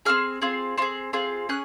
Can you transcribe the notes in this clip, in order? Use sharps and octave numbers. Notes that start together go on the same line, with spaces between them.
C4 F4 G#4 F6
C4 F4 G#4
C4 F4 G#4
C4 F4 G#4
C#4 G#4 F#6